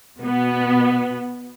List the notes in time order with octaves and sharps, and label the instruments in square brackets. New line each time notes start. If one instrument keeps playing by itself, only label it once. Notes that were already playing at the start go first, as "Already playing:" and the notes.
[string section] B2 B3